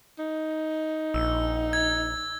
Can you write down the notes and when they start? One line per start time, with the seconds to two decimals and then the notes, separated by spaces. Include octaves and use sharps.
0.19 D#4
1.14 A#1 E6
1.73 G#6